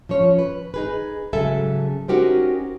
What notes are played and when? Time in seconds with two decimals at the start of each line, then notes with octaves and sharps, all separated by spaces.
0.09 F3 C#4 C#5
0.39 B4
0.74 D#4 G#4 B4
1.33 G#2 C#3 F#3 A4 E5 G#5
2.08 C#4 D#4 F#4 G4 A#4 C5